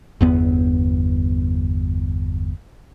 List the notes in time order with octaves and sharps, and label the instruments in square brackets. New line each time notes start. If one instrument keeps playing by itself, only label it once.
[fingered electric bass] G1 E2 B3